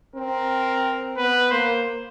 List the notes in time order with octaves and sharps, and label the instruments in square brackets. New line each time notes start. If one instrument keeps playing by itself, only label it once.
[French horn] C4 [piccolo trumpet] A#4
[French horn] B3 [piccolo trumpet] B4
[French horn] A#3 [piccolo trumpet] C5